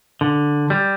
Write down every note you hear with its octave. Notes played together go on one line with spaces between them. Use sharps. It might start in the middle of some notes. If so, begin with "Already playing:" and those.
D3
G3